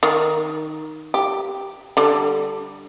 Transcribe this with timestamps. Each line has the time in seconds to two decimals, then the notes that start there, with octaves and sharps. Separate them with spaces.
0.03 D#3
1.14 G4
1.97 D3 G3